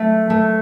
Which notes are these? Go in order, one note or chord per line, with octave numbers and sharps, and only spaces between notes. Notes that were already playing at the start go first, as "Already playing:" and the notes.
Already playing: A3
A3